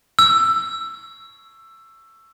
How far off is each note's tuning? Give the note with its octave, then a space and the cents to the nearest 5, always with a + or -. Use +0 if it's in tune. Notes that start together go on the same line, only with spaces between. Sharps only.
E6 +15